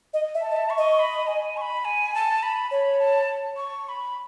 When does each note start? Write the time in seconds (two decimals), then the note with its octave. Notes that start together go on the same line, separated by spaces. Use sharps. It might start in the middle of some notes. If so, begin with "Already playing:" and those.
0.14 D#5
0.35 E5
0.41 A5
0.51 D#5
0.56 E5
0.70 C#6
0.78 D#5
0.99 B5
1.27 G#5
1.57 C#6
1.61 B5
1.85 G#5
2.14 A5
2.43 B5
2.71 C#5 B5
2.99 A5
3.57 C#6
3.85 C#6
3.89 B5